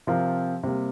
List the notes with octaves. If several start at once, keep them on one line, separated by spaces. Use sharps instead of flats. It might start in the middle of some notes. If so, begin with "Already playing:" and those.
C3 F3 C4 F4 A#4
C3 G3 A#3